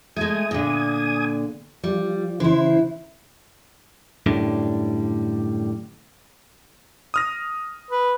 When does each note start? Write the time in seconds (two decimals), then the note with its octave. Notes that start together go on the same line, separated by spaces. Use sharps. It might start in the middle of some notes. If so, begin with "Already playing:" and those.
0.17 G#3 A3 G#5 D#6
0.51 A#2 D3
1.84 F3 G3
2.40 C#3 E3 E4 C5
4.26 F#2 A2 D3 G3
7.14 D#6 F6 A#6
7.91 B4